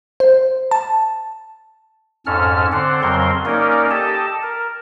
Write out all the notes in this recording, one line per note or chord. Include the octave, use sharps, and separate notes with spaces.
C5
A5
F2 G#2 C#4 A4 F6
D3 C4 C5 D5 F#5
F2 C#3 F#3 C4 A#4 C6
A#3 C#4 D#4 A#4 D5
G4 A4 D#5 A5
A#4